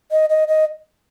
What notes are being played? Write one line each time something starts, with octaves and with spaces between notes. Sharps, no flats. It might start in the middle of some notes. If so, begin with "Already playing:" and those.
D#5
D#5
D#5